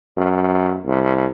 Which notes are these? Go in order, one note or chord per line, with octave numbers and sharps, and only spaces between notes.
F#2
C2